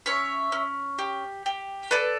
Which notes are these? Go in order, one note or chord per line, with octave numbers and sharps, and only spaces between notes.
C#4 C#5 E5
C#4
G4
G4
A4 B4 D5